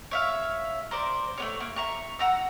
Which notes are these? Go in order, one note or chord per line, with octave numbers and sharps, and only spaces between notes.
C#5 E5 F5
A#4 C5 D5
A3 B3 C#5
A#3
E5 A#5 C#6
F#5 A#5 E6